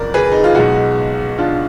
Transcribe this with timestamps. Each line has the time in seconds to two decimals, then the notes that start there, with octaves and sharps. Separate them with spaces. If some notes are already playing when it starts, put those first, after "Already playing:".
Already playing: F#1 F2 F#3 A#4 D5
0.14 G#4 B4
0.32 D#4
0.44 F4
0.55 B1 B2 G#3 D#4 F#4
1.38 D4 F4